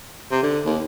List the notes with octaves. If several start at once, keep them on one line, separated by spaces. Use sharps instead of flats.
C3
D3
D#2